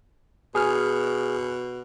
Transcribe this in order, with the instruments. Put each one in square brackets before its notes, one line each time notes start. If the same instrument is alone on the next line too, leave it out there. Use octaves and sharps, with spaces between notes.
[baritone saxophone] B2 [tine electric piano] G#4 G#5 F6